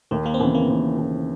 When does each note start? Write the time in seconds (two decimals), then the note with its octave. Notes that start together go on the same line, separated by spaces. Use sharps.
0.11 D#2 A3
0.26 A#3
0.34 C4
0.40 C#3 E3 B3
0.55 A#3
0.69 D#2
0.99 C#3 E3